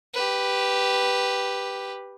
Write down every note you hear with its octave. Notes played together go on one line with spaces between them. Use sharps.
G4 B4